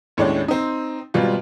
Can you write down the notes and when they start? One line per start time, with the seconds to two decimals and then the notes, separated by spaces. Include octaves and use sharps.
0.17 D#2 A2 G#3 C#4 D4 D5
0.48 C4 D#4
1.14 G#1 B2 G3 F4